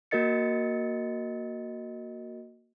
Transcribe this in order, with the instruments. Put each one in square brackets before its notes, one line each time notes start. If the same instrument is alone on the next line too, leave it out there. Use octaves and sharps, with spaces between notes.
[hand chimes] A#3 F#4 A#4 D#5 A6 C#7